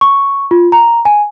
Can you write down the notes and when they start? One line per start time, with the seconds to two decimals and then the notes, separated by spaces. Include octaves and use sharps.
0.01 C#6
0.51 F4
0.72 A#5
1.05 G#5